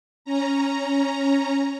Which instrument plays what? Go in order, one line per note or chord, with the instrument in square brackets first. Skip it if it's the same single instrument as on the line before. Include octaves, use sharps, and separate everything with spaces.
[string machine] C#4 A#5